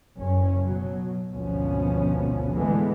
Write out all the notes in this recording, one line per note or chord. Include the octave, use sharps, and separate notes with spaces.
F#1 G2 C#4
B2 F#3
G#1 D2 B2 F3 B3 C#4
A2 D3 E3 G#3 A3 B3